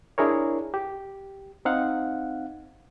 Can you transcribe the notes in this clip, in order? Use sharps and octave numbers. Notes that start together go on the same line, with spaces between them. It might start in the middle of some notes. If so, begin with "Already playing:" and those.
D4 E4 G#4 A#4 C#5
G4
C4 D#4 F5 F#5